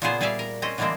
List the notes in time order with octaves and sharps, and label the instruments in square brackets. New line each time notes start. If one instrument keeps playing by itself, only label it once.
[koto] A#2 C#3 B3 F4 G#4 C5
G3 G#4 D5 E5 F5
A#4
C4 C#4 D#5
D3 E3 G3 G#3 A#3 C4